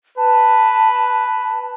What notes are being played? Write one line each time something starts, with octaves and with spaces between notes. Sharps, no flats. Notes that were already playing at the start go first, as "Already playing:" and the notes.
B4 A5